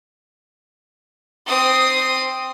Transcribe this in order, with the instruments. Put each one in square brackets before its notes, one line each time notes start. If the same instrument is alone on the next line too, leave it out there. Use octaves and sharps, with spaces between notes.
[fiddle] C4 D#6